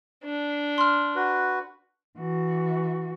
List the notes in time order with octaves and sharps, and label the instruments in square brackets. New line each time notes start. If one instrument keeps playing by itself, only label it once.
[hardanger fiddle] D4
[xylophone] C6 F6
[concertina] F#4 B4
[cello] E3 F#4